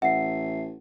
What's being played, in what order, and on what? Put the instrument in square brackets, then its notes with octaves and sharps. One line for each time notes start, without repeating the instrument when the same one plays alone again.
[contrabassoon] A1 [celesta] E5 C7 [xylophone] F#5